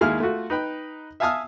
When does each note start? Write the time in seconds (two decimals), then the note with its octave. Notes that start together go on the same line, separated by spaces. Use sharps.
0.01 D#2 G#3 E4 G#4 F5 F6
0.20 A3 F4 F#4
0.50 D#4 B4 G5 B5
1.20 E5 F5 G#5 A5 D#6 F6